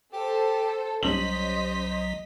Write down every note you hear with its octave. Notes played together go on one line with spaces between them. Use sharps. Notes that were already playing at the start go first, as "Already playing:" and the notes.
G4 A4 C5
B1 F#3 G3 C#4 C5 D#5 B6 F#7